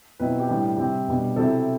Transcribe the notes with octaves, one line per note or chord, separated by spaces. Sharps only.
B2 F#3 C4 E4 B4
F#4
G4
A2 E3 G3 D4
C3 G3 C4 G4
B2 G3 D4
C3 F#3 C4 E4 A4